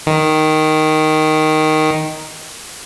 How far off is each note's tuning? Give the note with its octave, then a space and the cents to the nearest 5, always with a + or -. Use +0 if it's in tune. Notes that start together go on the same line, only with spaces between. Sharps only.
D#3 +0